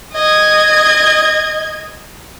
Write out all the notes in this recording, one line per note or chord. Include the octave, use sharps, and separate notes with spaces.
D#5 G#6